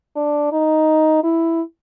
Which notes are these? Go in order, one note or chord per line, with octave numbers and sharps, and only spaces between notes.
D4
D#4
E4